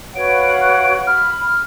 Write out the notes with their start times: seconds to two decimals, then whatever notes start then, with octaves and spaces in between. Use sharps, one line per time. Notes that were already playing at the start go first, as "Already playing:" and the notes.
0.15 F#4 B4 C#5 F5 F#5 D7
1.07 B5 F6